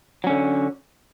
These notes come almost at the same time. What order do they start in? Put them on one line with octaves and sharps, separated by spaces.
F#3 C#4 D3